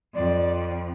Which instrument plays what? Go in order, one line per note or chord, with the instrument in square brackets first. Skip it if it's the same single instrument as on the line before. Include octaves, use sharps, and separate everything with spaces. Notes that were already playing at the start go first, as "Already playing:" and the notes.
[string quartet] F2 [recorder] D5